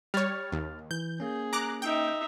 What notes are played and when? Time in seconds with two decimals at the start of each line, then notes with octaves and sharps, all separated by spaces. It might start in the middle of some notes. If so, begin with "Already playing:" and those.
0.14 G3 C#5 F6 A6
0.52 D#2
0.91 E3 G6
1.20 A#3 C#4 G#4
1.53 A#5 D6 F#6
1.82 D#4 E5 G5